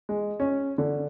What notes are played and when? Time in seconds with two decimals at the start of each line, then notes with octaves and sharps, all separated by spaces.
0.09 G#3
0.40 C#4
0.78 D3